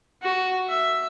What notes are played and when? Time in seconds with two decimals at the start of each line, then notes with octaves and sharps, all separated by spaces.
0.22 F#4
0.69 E5